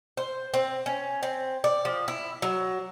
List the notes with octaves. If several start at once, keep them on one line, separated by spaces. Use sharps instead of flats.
C5
C4
C#4
C4
D5
F3
E4
F#3